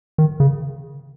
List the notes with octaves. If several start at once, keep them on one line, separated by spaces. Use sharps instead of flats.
D#3
C#3